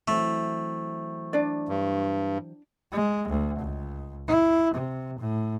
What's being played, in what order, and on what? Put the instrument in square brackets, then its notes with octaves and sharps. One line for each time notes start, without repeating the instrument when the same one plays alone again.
[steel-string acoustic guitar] E3 F#3 C4 [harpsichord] A3
[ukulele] D4 D5
[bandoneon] G2
[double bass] G#3
D2
C#2
E4
C3
A2